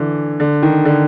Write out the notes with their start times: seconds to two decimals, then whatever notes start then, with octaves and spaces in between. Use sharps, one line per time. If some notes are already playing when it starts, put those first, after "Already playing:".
Already playing: D3 E3
0.40 D3
0.63 D#3
0.85 D3